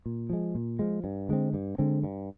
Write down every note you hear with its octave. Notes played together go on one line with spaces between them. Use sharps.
A#2
F3 G#3
A#2
F3 G#3
G2
D3 G#3 C4
G2
D3 G#3 C4
G2